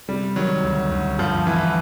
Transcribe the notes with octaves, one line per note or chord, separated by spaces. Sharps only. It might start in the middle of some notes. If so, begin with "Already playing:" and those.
C3 G3
D#3 F#3
D2
D2
G2 F3
E3